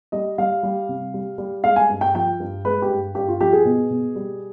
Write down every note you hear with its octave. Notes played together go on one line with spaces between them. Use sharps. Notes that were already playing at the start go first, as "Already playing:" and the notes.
G3 D#5
G3 F5
G3
C3
G3
G3
G#3 F5
G#5
G2
G5
F3 G5
G2
G#3 B4
G4
G2
G2 G4
F4
F3 G4
G#4
B2
B2
G3